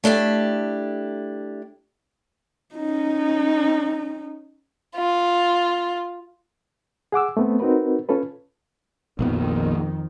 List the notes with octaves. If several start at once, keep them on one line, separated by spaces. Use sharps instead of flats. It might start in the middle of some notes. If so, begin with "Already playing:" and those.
A3 D4 E4 G4
C#4 D#4
F4
G#4 F#5 D6 E6
A3 B3 C4
C4 D#4 F#4 A#4 B4
C#4 F4 A4 B4
A#1 F2 A#2 D#3 B3